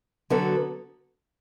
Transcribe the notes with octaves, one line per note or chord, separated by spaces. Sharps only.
D3 F#3 B3 F#4 A4